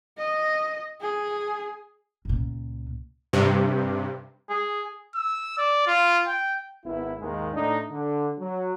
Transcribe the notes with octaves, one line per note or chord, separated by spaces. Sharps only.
D#5
G#4
C#2 A#2
G2 C3
G#4
E6
D5
F4
G5
G#1 B3 E4
D#2 G#2 D#3 G#3
A2 D4 D#4
D3
F#3